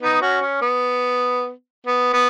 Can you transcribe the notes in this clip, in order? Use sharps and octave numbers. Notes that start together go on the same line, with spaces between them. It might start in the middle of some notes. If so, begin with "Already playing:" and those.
B3 D#4
C#4 F#4
C#4
B3
B3
B3